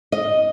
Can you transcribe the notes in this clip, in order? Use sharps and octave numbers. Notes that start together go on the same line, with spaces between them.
D#5